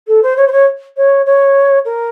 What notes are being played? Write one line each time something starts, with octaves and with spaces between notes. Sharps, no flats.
A4
C5
C#5
C5
C#5
C#5
C#5
A#4